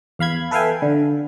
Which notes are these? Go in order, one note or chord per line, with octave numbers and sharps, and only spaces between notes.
E2 F5 B5 G#6
A4 B4 E5 F5 G5 G#5
D3